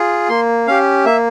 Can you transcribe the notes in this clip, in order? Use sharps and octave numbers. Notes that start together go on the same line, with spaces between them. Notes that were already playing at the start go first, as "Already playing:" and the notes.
Already playing: F4 G#4
A#3 C6
C#4 G4 F5
A#3 E5